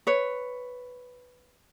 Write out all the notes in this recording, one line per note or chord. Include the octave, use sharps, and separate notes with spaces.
B4 C#5